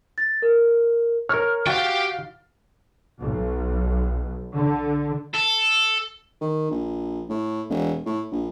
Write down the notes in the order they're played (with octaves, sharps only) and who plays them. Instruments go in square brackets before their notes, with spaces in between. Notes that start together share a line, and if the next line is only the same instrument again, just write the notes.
[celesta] A6
A#4
[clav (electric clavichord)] A#4 C#5 [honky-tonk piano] F6
[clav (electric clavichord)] F#4 [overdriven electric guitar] G4 G5 [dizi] F5 [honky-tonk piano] A6
[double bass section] B1
D3
[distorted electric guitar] A4
[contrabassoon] D#3
A#1
A2
E1
A2
A#1